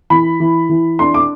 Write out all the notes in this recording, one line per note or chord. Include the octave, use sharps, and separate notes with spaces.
E3 B5
E3
E3
D4 C6
D6